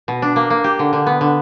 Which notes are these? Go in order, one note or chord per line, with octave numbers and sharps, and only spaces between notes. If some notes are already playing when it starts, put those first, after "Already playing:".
B2
D4
A#3
A#3
G4
D3
D3
B3
D3